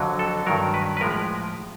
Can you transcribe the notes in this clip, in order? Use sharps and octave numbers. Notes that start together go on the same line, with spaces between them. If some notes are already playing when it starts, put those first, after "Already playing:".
Already playing: F2 D3 F#3
A4
G2 D#3 F#3 A#4
B4
B4
A2 F3 G#3 A#4